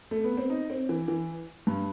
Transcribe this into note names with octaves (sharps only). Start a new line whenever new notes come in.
A3
B3
C4
D#4
C4
E3
E3
G2